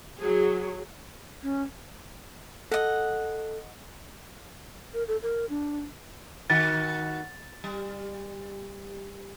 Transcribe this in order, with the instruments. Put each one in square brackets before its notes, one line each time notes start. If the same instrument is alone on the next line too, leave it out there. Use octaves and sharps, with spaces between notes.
[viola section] F#3 G#4
[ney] C#4
[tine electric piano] A4 [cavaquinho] D#5 F#5
[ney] A#4
A4
A#4
D4
[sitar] D#3 F#4 [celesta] A6
[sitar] G3